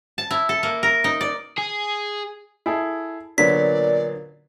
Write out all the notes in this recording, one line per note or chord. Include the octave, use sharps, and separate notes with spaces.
A5
E4
A4
A#3
A#4
D#4
D5
G#4
E4 G#4 A4
A#2 D3 F#3 B3 D5 B6